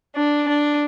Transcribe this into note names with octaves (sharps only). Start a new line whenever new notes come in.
D4
D4